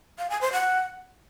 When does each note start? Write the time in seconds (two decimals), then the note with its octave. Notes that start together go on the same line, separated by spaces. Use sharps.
0.18 F5
0.30 G#5
0.41 C5
0.53 F#5